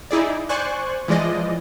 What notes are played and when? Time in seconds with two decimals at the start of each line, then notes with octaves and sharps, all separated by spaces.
0.11 D#4 E4 G#4 D5
0.49 C5 D5 G#5 C#6 F#6
1.08 E3 F3 G#3 D5 D#5